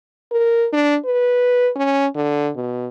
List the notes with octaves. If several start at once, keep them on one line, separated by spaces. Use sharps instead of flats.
A#4
D4
B4
C#4
D3
B2